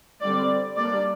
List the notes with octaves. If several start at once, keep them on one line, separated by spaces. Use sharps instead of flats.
D3 G3 C4 D5
G3 A#3 D4 D5